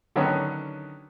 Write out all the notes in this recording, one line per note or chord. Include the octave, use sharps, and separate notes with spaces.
D3 D#3 F#3 B3 C#4